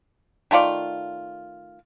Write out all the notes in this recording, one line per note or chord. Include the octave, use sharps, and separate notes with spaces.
D#3 A3 F4 D5